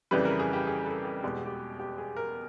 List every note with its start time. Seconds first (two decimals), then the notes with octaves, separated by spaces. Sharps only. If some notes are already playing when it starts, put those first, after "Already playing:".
0.11 F2 C#3 E3 G3 B4
0.25 A#4
0.39 G#4
0.53 G4
0.67 G#4
0.86 A4
1.04 A4
1.23 E2 B2 G#3 G4
1.35 F#4
1.45 G4
1.79 G4
1.98 G#4
2.17 A#4